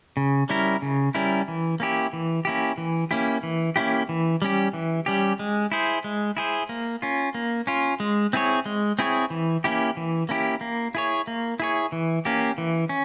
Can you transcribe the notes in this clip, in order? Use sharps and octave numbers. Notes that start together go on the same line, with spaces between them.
C#3
G3 C#4 E4 A#4
C#3
G3 C#4 E4 A#4
E3
A#3 C#4 E4 G4
E3
A#3 C#4 E4 G4
E3
A#3 C#4 E4 G4
E3
A#3 C#4 E4 G4
E3
G3 C#4 G4
E3
G3 C#4 G4
G#3
E4 G#4 C5
G#3
E4 G#4 C5
A#3
C#4 F4
A#3
C#4 F4
G#3
C4 E4 G#4 C#5
G#3
C4 E4 G#4 C#5
E3
A#3 C#4 E4 G4
E3
A#3 C#4 E4 G4
A#3
E4 G#4 C#5
A#3
E4 G#4 C#5
E3
A#3 C#4 G4
E3
C#4